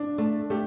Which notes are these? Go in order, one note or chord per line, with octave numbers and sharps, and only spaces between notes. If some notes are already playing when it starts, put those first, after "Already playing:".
Already playing: D4
A3 D4
A3 G4